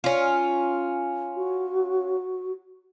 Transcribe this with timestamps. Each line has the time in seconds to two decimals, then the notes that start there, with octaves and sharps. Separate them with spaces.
0.04 C#4 F4
1.36 F#4